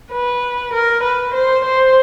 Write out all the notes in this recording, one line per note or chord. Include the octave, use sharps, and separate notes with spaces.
B4
A#4
B4
C5
C5